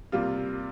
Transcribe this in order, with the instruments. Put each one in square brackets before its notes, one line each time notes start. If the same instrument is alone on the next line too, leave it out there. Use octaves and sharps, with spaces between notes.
[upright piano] C3 G3 A#3 F4